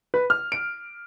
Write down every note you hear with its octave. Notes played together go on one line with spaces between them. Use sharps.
B4
F6
D7